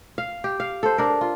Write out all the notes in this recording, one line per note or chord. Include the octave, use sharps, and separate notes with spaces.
F5
G4
F5
A4 C5
D4 A#4
F4